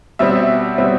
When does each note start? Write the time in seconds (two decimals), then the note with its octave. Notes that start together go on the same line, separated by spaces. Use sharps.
0.19 B2 G3 C4 E5
0.78 B2 G3 C4